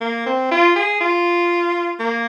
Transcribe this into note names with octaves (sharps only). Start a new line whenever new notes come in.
A#3
C4
F4
G#4
F4
A#3